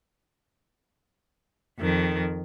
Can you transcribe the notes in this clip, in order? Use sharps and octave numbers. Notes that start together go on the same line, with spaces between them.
F2 D#3